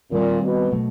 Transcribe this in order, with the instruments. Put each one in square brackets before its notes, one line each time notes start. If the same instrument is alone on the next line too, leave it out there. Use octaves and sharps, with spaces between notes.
[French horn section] A#2 [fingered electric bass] D#3 G3 C4
[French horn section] B2
[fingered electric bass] B2 F#3 A3